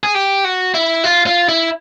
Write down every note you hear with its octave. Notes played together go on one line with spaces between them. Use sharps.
G#4
G4
F#4
E4
F4
F4
E4